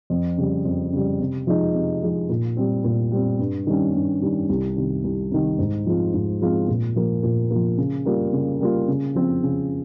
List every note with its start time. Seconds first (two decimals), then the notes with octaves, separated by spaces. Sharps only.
0.10 F2
0.38 C#3 G3
0.65 F2
0.93 C#3 G3
1.20 C3
1.47 F3 G#3 D#4
1.75 C3
2.03 F3 G#3 D#4
2.29 A#2
2.57 G3 C4
2.84 A#2
3.12 G3 C4
3.39 G2
3.67 D#3 G3 C#4
3.94 G2
4.22 D#3 G3 C#4
4.49 C2
4.76 C3 D#3
5.04 C2
5.31 C3 D#3
5.59 G#2
5.86 F3 G#3 C4 F4
6.14 G#2
6.41 F3 G#3 C4 F4
6.68 A#2
6.96 F3 A#3
7.23 A#2
7.51 F3 A#3
7.78 C#3
8.05 G3 A#3 F4
8.33 C#3
8.60 G3 A#3 F4
8.88 C#3
9.15 F3 C4
9.43 C#3